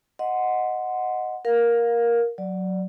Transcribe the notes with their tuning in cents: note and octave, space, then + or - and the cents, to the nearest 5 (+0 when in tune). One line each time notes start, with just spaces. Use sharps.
D#5 +0 F#5 -10 C6 -15
A#4 +10 F5 +20
F#3 +0 D5 +0